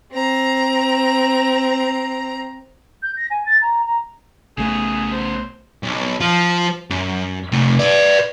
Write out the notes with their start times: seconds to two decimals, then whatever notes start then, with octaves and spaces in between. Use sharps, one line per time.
0.12 C4 A#5
3.02 G6
3.17 A#6
3.31 G#5
3.46 A6
3.62 A#5
3.86 A#5
4.58 B1 C#3 A3 B3 G#4
5.12 C5
5.83 B1
6.21 F3 F4
6.90 F#2
7.52 C3 A3
7.79 B4 D5